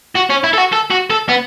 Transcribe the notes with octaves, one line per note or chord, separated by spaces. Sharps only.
F#4
C#4
E4
A4
F#4
A4
F#4
A4
B3